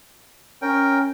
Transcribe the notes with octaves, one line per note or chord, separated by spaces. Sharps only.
C#4 A#4 G5